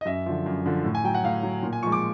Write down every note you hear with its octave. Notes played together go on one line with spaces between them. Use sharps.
D#5
F#2 E5
D3 F3
F#2
D3 F3
A2
G#5
F#3 G5
F#5
A2 F5
F#3
A#2
G#5
F3 G#3 C#6
D6